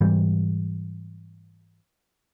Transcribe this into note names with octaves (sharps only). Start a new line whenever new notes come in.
G#2 E3 G3